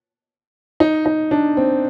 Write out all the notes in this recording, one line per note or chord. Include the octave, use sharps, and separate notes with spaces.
D#4
D#4
D4
C4